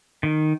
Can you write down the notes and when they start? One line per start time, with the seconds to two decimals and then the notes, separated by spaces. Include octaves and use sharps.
0.23 D#3